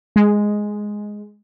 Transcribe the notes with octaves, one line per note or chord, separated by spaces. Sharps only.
G#3